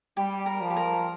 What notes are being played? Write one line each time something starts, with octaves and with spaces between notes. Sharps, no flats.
G3 G4
A#4
F3
G4
A#4